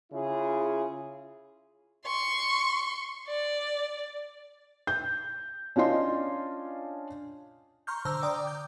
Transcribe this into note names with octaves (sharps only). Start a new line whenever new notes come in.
C#3 E4 F4 G#4
C6 C#6
D5
G6
C#4 D4 F4 D#5 C6
A#5 C6 C#6 F6 G6
D3 C5 A#5 D6 E6
D5 G5 A#5 D6 D#6
G6